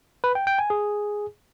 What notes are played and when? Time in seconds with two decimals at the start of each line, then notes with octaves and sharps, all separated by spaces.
0.24 B4
0.35 G5
0.47 G5
0.59 G#5
0.70 G#4